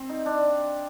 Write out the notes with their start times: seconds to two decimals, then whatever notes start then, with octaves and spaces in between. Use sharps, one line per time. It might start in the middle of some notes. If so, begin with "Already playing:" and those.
Already playing: C4
0.09 D#4
0.26 D4